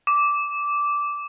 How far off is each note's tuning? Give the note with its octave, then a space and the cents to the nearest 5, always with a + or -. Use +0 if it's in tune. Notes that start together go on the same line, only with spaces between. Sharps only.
D6 -10